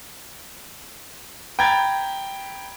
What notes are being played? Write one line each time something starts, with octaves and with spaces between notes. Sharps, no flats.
G5 A#5 B5 G#6 A6